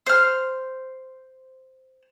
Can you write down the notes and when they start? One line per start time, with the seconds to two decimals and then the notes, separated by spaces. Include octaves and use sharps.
0.07 C5 F6